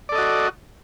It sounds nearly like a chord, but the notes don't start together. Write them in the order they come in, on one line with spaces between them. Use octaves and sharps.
D5 A4 D#5 F#4